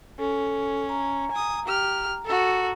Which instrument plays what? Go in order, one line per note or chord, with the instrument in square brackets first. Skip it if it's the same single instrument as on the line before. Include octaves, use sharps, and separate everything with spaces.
[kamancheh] C#4 [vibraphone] A4
[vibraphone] A#5
[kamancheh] G#5 D#6
G4 F6
F#4 A4